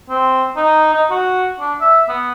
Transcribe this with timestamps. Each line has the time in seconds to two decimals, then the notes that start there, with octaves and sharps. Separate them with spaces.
0.10 C4
0.56 D#4
0.94 D#4
1.10 F#4
1.60 D4
1.81 E5
2.09 B3